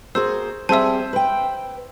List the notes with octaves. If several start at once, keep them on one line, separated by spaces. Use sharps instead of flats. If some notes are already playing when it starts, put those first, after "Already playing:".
A#3 F#4 G#4 C5 E6
G3 C4 G#4 C5 E5 A5 E6
B4 G5